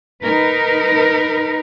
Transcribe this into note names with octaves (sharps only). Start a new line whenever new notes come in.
D#4 A#4 B4